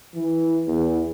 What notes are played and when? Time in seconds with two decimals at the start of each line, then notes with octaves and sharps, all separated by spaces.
0.15 E3
0.67 E2